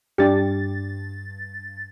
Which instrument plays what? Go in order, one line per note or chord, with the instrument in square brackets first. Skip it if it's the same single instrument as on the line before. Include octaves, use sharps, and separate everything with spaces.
[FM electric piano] G2 A6 [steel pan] D4 G4